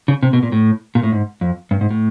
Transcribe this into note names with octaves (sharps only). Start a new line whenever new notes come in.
C#3
C3
B2
A#2
A2
A#2
A2
G#2
F2
G2
G#2
A2